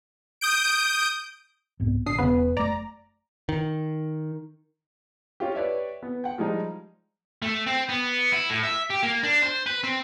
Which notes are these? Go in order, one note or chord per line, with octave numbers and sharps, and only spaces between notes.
D#6 G6 D7
C2 G#2 B3
A#1 D3 D#6 C7
E1 C#3 B3 B4
F#1 A3 D5 A#5
D#3
C#4 F4 G4
G4 B4 C#5 D5 E5
B3
F#5 G5
F3 G3 G#3 D#4
A3
C4
B3
E4
A2
E5
G4
A#3
D4
C5
B4
C4